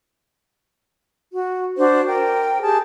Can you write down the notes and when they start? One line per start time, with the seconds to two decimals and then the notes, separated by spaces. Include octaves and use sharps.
1.32 F#4
1.77 D4 F#4 C5
2.07 A#4 G5
2.62 G4 G#4 A5